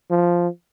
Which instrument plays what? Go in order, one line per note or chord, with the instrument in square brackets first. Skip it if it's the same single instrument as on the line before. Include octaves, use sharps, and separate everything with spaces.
[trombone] F3